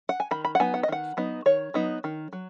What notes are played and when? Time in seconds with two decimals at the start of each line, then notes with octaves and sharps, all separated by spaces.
0.09 F#5
0.20 G#5
0.31 D#3 B5
0.45 B5
0.55 F#5
0.60 F#3 B3 D#4 G#5
0.74 F#5
0.83 D#5
0.88 D#3 F#5
1.17 F#3 B3 D#4
1.46 D#3 C#5
1.74 F#3 B3 D#4
2.04 D#3
2.33 F#3